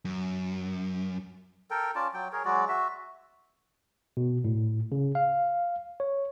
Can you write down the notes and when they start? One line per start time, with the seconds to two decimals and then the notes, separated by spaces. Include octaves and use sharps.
0.05 F#2
1.71 A4 A#4 G5
1.95 C#4 F4 D5 A5
2.14 F#3 G5
2.32 G#4 A#4 C#5
2.45 F#3 G#3 F#4 D5
2.69 F#4 E5
4.17 B2
4.45 A2
4.92 C#3
5.15 F5
6.00 C#5